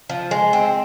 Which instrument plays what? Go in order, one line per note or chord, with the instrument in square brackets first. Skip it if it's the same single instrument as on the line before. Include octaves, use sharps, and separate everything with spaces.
[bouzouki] F3
G#3
C4